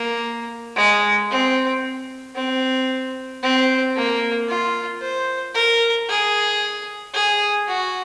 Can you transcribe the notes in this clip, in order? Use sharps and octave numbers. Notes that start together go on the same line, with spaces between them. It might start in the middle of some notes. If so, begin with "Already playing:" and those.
Already playing: A#3
G#3
C4
C4
C4
A#3
F4
C5
A#4
G#4
G#4
F#4